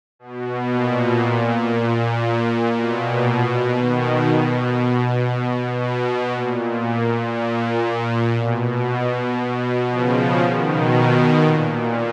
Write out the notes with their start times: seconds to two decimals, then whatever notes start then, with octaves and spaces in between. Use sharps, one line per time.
0.19 B2
0.71 A#2
1.72 A#2
2.75 B2
3.77 B2 D#3
4.28 B2
5.81 B2
6.32 A#2
7.34 A#2
8.36 B2
9.38 B2
9.89 C#3 F3
10.41 B2 D#3
11.42 A#2